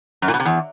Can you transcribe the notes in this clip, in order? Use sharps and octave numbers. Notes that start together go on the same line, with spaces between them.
F#2
A#2
B2
C3
E2